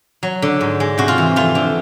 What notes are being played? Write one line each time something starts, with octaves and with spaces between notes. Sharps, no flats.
F#3
D3
G#2
G#3
C3 F#4
F4
E3
F2 F4
D3